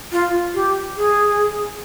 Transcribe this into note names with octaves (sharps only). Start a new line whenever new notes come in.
F4
G4
G#4